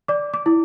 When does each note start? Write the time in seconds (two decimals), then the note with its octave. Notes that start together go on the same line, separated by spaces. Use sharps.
0.08 D5 D6
0.34 D6
0.46 E4